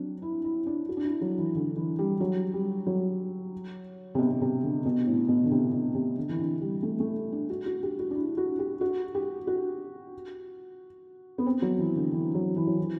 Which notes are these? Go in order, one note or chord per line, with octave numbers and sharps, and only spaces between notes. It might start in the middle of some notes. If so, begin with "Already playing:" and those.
Already playing: F#3 C4 D4
E4
E4
D4
F#4
D4
E4
F#3
E3
D3
E3
G3
F#3
G3
F#3
C3
B2
B2
C3
D3
B2
A2
B2
D3
C3
B2
C3
D3
E3
D3
G3
A3
A3
D4
F#4
F#4
G4
F#4
D4
E4
F#4
G4
F#4
G4
F#4
B3
C4
F#3
E3
D3
E3
F#3
E3
F#3
E3